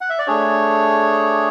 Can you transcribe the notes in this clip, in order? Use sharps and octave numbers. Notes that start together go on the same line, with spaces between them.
F#5
E5
D5
A3 D4 G#4 C#5